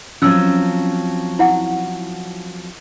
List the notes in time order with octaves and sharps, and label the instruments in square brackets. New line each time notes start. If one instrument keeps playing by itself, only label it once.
[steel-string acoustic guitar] F3 F#3 C4 [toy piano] C#4 E6
[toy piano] E4 F#5